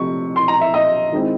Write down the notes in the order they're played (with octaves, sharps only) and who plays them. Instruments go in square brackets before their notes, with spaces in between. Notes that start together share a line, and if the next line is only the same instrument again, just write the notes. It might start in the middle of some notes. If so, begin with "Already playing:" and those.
Already playing: [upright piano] C3 F3 A3 C#6
C6
A#5
E5
D#5
D#3 G#3 C4 E4